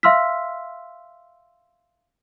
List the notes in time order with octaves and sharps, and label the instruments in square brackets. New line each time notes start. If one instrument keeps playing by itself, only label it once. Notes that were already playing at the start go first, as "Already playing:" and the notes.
[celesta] E5 F5 C6 E6 F6 B6